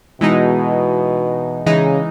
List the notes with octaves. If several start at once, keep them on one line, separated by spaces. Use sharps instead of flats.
B2 E3 G#3 D#4
C#3 E3 G#3 D#4